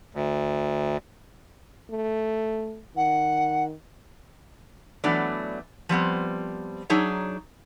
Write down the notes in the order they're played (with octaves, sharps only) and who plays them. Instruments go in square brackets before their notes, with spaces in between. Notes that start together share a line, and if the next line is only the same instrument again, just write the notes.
[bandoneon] D2
[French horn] A3
[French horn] D#3 [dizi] F#5
[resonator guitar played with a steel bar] E3 F#3 A3 B3 D4 D5
F3 G3 B3 C4
F#3 D4 D#4 G#4 C#5 E5